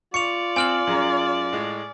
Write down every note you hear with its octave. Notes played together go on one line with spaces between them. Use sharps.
F4 D5 C#6 C#7 F7
C4 C5 G#5 F6 D7 F#7
F#2 G#4 A#5
A2 G#3